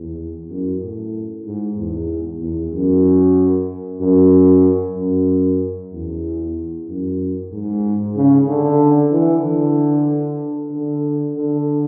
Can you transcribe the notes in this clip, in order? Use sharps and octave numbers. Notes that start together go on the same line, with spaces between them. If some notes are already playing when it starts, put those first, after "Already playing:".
Already playing: E2
F#2
A2
G#2
E2
E2
F#2
F#2
F#2
E2
F#2
G#2
C#3
D3
E3
D3
D3
D3